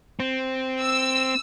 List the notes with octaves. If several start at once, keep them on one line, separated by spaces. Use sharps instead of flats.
C4
E6